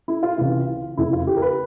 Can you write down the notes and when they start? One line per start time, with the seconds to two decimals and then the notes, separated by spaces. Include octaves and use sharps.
0.08 E4
0.23 F4
0.38 C#2 C3 E3 F4
0.97 F1 E2 C#3 E3 E4
1.13 F4
1.27 G4
1.37 A#4
1.42 B4